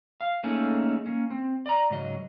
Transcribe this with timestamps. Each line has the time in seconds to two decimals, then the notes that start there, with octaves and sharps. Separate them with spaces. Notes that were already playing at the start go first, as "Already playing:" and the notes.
0.21 F5
0.43 A3 A#3 C#4 D#4 G#4 A4
1.06 A#3 C#4
1.30 C4
1.66 D5 A#5
1.90 G#2 C#3 F#3 D#5